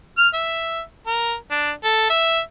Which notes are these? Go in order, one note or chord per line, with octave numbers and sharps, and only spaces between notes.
F6
E5
A#4
D4
A4
E5